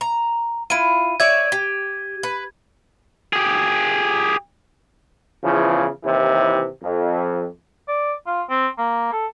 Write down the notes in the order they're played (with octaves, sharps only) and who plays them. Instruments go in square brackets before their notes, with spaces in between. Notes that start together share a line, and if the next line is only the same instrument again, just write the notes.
[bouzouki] A#5
[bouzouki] E4 F4 [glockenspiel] D#7
[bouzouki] C#5 D5 E5 [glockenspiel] G#6
[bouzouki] G4
B4
[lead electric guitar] G4 G#4
[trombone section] E2 C#3 E3 F3
D#2 C3 E3
F2
[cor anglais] D5
F4
C4
A#3
A4